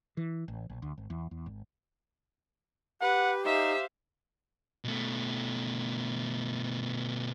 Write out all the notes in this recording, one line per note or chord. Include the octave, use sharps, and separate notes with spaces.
E3
A1
A#1
D2
G#1
E2
E2
G#1
G4 B4 F#5
D#4 C5 E5 F5
B2 A3